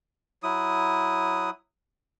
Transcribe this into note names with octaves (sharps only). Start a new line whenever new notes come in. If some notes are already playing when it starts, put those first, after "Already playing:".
F#3 E4 D#6